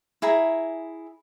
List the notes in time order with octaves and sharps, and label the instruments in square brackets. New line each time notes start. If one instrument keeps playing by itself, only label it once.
[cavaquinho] E4 G#4 A#5